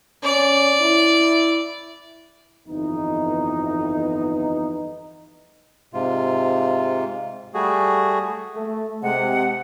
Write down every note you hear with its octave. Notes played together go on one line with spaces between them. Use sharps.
C#4 D5
E4
G1 F2 E3 B3 D#4
G#2 C3 F4
G3 A3 F#4 G#4
A3
C3 G#3 F#5